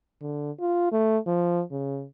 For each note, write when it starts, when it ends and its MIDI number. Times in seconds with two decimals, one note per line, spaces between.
0.21 0.51 50
0.60 0.89 65
0.92 1.18 57
1.27 1.62 53
1.71 2.05 49